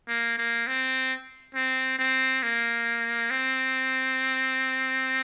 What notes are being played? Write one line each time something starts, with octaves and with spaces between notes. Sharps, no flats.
A#3
A#3
C4
C4
C4
A#3
C4